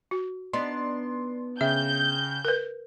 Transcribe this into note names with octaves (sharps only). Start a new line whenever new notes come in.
F#4
B3 D4 D#4 C6
C#3 E5 G5 G6
A#4 B4